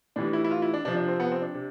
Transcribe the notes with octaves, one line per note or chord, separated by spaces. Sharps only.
A2 E3 G3 D4
E4
E4
F4
E4
D4
C3 F3 D4
D4
C4
B3
C4
D4
C3